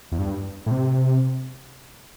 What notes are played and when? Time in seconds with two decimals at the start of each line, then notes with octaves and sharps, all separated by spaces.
0.12 E2
0.19 G2
0.66 A2
0.71 C3